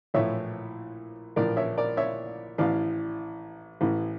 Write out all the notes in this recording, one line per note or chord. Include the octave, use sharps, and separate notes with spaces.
A#1 A2 E3 C#5 E5
A#1 A2 E3 A#4 D5
C#5 E5
A#4 D5
C#5 E5
A1 A2 E3 D5 F5
A1 A2 E3